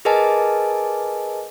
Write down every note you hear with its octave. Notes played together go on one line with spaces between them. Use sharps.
G#4 A#4 B4 D#5 G#5 A5